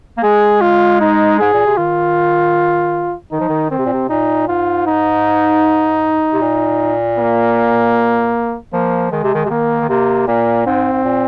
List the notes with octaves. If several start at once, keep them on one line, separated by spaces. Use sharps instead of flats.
A#3
G#3 G#4
F4
D#4
G#2 G#4
A#2
C3
D#3 F4
D#3 D#4
F3
D#3
D#3 C4
C3
A#2
C3
A#2 D#4
G#2 F4
D#4
C3
A#2
A#3
F3 A#3
D#3 G#3
C3
D#3
C3
D#3 A#3
D#3
C3 A#3
A#2 A#3
G#2 C4
G#2
A#2